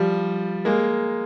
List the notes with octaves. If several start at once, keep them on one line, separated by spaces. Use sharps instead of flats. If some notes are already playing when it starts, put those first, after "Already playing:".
Already playing: F3 G3
G#3 A#3